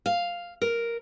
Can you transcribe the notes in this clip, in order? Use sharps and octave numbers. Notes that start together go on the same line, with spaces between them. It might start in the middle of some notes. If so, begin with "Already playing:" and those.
F5
A#4